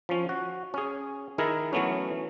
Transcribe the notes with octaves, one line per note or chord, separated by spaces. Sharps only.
F3 C#4
F#4
C#4 G#4
D#3 E4 G#4 A#4
E3 F#3 A3 B3 C#4